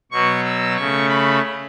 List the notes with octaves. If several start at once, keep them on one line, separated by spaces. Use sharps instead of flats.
B2 F#3 B3 C#6
E6
C#3 A3 C#6
B5